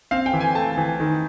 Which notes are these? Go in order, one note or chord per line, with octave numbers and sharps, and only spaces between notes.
C4 F5
G5
E3
G#5
A3 A5
E3
D#3